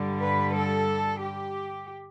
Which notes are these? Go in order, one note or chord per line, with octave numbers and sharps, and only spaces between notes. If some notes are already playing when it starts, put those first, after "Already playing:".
Already playing: G2 D3 G3
B4
A4
G4